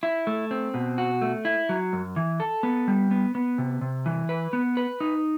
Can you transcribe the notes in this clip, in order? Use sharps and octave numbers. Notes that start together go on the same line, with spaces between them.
E4
A3
C4
B2
F#4
A3
E4
F#3
F#2
E3
A4
B3
G3
B3
B3
C3
C3
E3
B4
B3
B4
D#4